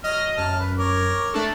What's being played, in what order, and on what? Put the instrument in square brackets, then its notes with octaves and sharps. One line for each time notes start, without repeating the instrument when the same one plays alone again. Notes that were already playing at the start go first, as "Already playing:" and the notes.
[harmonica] F#3 F6 [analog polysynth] D#5
[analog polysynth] F#2 [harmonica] A5 F6
[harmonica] B4
A#4 C#5 D6
[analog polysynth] A3 D4 A4